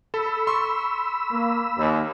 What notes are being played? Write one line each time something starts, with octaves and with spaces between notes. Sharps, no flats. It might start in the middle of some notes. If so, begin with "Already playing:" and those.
A4 B5 E6
C6 C#6
A#3
D#2